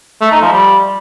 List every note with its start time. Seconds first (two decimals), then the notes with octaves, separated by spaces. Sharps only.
0.21 A3
0.32 D#4
0.42 F3
0.52 G3